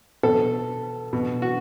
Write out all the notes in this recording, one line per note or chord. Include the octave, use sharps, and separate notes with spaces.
B2 A4
B2
F#4